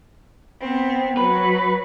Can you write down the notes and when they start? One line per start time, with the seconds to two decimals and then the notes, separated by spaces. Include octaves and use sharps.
0.61 B3 C4
1.17 F#3 B4